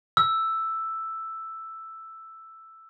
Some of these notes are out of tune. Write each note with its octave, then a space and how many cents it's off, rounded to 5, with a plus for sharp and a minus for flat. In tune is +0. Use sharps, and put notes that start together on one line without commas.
E6 +0